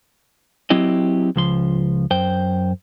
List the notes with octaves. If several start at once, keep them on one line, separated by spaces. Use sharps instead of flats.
F#3 C4 E4 G4 D#5
C#2 F3 C6
F#2 C5 G5